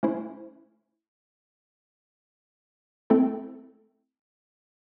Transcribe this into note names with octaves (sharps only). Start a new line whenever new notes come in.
A3 C#4 E4 C5
A3 C4 E4 A4